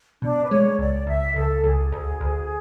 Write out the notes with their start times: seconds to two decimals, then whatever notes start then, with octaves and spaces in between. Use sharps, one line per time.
0.22 B2 D4
0.44 B4
0.50 G#3 C#5
0.79 C#2 D5
1.07 C#2 E5
1.36 C#2 A4
1.64 C#2 G#4
1.92 D2
2.21 D2